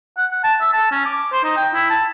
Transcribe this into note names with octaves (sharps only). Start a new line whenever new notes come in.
F#5
F#5
A5
E5
A5
C#4
D6
C5
D#4
G5
E4
A5